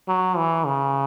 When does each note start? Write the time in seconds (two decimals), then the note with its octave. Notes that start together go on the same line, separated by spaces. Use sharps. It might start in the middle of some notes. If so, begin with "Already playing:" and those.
0.08 F#3
0.37 E3
0.66 C#3